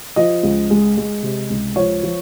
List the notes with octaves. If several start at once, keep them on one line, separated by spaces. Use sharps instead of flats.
F3 D#5
C#2
G#3
G#3
C3
C#2
F3 C#5
F3